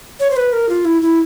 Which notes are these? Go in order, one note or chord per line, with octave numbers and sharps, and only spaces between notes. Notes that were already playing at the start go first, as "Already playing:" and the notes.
C#5
C5
B4
A#4
F4
E4
E4